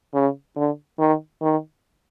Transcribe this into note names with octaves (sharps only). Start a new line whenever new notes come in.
C#3
D3
D#3
D#3